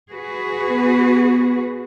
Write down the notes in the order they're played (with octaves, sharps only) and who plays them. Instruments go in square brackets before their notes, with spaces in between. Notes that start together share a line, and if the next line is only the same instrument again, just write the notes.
[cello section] F#4 G#4 B4
[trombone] B3